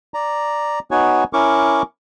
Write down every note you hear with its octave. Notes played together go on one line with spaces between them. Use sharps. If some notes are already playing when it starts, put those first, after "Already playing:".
D5 A#5
B3 D#4 F#4 C#5 G#5
C#4 E4 A#4 C#6 D6